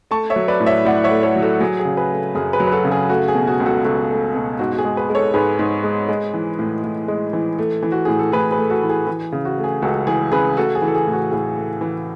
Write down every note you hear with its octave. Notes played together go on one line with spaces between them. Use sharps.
A3 A5 C#6
C#5 E5
F#3
B4 D5
A2
C#5 E5
A2 D5 F#5
C#5 E5
A3
A4 C#5
F#3
F#4 A4
F#3 G#4
G#4
C#3
G#4 B4
A3
F#2 G#4
G#4 B4
F#3
B4
F#4 A4
C#3
G#4
A3 F#4
G#4
B2
F#4
C#2
F#4 A4
C#2 F#4 A4
A3
B2
G#2 F#4
F#4
G#4
G#3
G#4 B4
G#3
A4 C#5
G#2 G#4 B4
G#2
G#3
G#3
E3
A2
A2
G#3
E3
A3
E3
F#4
A2 G#4
A4
A2 G#4 B4
G#4 B4
A3
F#4 A4
E3
G#4
E3 G#4
C#3
F#4
A3
G#4
C#2 F#4 A4
E3 G#4
C#3 G#4 B4
A3 F#4 A4
G#4
E3
A4
G#4
A2
F#4
A2 G#4
A3
E3